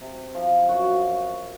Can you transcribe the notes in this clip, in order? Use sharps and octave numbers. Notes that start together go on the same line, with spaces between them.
C3
F3
F#2 F#4